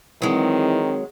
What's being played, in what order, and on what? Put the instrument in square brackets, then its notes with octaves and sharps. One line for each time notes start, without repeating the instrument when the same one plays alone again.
[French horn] D#3 [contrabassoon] E3 [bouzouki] F#3 G#3 [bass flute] C4